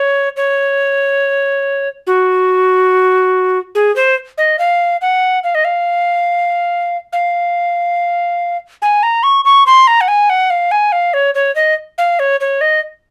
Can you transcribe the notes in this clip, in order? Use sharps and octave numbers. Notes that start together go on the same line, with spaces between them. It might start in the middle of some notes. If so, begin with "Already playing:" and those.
Already playing: C#5
C#5
F#4
G#4
C5
D#5
F5
F#5
F5
D#5
F5
F5
G#5
A#5
C#6
C#6
C6
A#5
F#5
G#5
F#5
F5
G#5
F5
C#5
C#5
D#5
F5
C#5
C#5
D#5